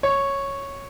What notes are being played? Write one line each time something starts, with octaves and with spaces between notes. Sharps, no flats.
C#5